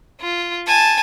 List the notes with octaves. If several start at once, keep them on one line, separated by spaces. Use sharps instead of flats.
F4
G#5 A5